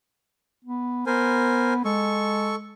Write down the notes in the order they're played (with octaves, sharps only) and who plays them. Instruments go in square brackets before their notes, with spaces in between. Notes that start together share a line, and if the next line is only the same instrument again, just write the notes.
[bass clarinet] B3
[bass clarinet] B3 [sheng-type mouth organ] A#4 C5 G#5
[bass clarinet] G#3 [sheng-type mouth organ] A4 C#6